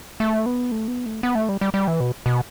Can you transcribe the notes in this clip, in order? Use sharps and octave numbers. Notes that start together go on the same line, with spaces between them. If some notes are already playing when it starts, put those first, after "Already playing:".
A3
B3
A3
B3
A3
B3
A3
G3
G3
G3
E3
B2
B2